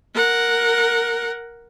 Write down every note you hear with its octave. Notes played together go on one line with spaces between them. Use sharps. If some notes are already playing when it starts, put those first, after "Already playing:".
A#4 F#5